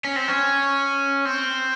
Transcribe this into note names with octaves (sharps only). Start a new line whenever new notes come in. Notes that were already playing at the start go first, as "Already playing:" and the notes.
C#4
C4
C#4
C4